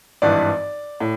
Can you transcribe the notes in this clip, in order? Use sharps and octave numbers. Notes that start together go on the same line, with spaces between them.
G#1 G2 E3 D5
A2